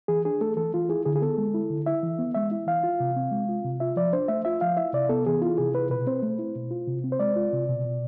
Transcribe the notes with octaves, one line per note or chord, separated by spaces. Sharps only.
E3 G#4
D4 G#4
A3 A4
E3 A4
E3 F4
E4 G#4
D3 G#4
G#4
B3 A4
G#3
E4
D3
E4 E5
E3
B3
G#3 E5
E4
E3 F5
F4
C3
C4
G#3
F4
C3
F4 E5
F3 D5
D4 C5
A3 E5
F4 E5
F3 F5
E4 E5
C3 D5
B3 A4
E3 G#4
E4 F4
C3 G#4
E4 B4
B2 B4
C4 C5
A3
E4
B2
F4
C3
C4
C5
G#3 D5
F4
C3
B2
B2